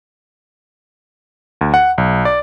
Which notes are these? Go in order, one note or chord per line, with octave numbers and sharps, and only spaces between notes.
D2
F#5
B1
D5